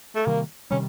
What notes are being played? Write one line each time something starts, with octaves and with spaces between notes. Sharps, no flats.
A3
C3 D#3 G3 A#3
C3 D#3 G3 C#4